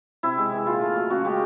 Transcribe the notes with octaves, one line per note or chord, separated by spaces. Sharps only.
C3 E4
G#3
E3
A#2 F4
A3
F#3
C#3 F#4
G#3 G4